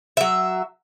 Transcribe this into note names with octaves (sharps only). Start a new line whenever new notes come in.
F#3 E5